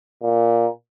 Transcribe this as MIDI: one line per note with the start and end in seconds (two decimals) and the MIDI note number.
0.23 0.67 46